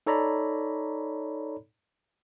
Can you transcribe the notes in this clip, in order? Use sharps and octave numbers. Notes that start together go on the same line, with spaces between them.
D#4 A4 C#5 D5 A#5 B5